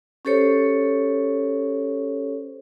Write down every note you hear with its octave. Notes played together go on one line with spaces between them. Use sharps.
C#4 G4 A4 C5 C#5